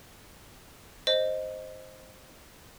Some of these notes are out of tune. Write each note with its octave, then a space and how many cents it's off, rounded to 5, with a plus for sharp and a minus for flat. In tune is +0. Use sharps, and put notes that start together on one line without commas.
C5 +0 D#5 +0